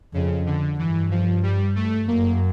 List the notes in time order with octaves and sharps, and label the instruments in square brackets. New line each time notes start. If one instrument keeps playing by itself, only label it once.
[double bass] F2 [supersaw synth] C#3
[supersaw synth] D3
[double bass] G2 [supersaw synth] E3
[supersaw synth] F3
G3
A3
[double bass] F#2 [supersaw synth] A#3